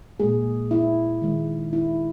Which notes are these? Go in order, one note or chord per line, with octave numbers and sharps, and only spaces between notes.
A#2 G#3 G#4
E4
D#3 G#3
E4